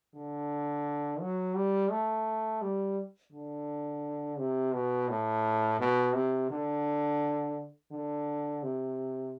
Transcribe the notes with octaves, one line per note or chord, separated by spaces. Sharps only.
D3
F#3
G3
A3
G3
D3
C3
B2
A2
B2
C3
D3
D3
C3